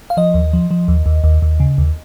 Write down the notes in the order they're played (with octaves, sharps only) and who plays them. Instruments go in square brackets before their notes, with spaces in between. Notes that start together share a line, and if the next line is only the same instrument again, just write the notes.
[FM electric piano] F5
F3 D#5
D#2
F3
F3
D#2
D#2
D#2
D#2
C#3
D#2